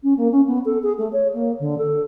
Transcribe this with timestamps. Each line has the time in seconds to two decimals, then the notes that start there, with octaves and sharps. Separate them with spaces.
0.03 C#4
0.17 A#3
0.31 C#4
0.46 B3
0.65 A4
0.83 G#4
0.98 A3
1.12 C#5
1.33 A#3
1.59 D3
1.78 A4